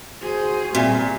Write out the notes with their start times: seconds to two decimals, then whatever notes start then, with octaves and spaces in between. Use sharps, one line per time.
0.21 F#4 G#4 C5
0.75 A#2 G3 C4 E5 G#5